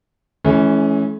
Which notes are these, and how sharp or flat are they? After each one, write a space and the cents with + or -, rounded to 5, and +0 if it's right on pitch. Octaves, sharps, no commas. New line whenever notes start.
E3 +0 A3 -45 C#4 +0